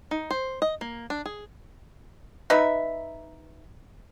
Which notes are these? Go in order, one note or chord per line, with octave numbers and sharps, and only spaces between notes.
D#4
C5
D#5
A#3
D4
G#4
D#4 B4 E5